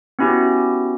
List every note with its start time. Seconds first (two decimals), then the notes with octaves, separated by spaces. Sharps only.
0.19 B3 C#4 E4 F#4 G4